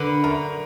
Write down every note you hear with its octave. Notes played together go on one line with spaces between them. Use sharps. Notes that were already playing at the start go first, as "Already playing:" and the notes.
Already playing: D3 A#4 B4 B5
F#2 A#4 A#5